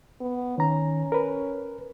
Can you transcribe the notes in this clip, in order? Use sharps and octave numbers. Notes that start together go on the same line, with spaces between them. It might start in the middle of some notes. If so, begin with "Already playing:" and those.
B3
D#3 C#4 A#5
A#4 B4